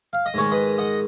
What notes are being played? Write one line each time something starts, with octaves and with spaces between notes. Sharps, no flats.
F5
D#5
G#2 D#3 G#3 C#5
B4 D#5
D#5 F#5